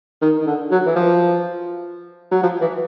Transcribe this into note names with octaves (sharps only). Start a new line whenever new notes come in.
D#3
D#3
D3
F#3
E3
F3
F#3
F3
E3